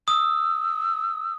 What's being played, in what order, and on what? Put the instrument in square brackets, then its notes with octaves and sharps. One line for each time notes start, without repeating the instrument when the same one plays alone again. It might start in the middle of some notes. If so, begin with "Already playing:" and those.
[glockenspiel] D#6 [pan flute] E6